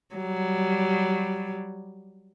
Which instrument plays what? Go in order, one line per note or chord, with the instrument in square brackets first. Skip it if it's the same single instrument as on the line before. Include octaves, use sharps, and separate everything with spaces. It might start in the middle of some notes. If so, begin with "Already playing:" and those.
[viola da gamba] F#3 G3